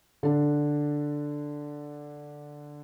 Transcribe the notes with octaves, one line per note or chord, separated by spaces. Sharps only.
D3 D4